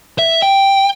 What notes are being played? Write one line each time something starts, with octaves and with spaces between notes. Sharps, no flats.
E5
G5